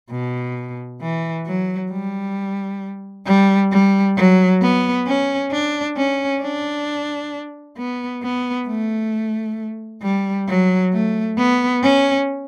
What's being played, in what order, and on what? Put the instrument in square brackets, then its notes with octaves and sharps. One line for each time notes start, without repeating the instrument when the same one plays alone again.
[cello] B2
E3
F#3
G3
G3
G3
F#3
B3
C#4
D4
C#4
D4
B3
B3
A3
G3
F#3
A3
B3
C#4